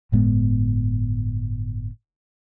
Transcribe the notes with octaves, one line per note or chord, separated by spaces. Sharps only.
G1 A2 G#3 B3